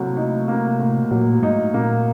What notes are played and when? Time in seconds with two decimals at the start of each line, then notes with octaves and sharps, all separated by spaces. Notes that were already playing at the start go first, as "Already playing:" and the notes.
Already playing: A2 C3 F#3 A#3
0.17 D#4
0.48 A#3
0.79 A2
1.11 A#2 F#3
1.42 G#2 D#4
1.74 A#2 A#3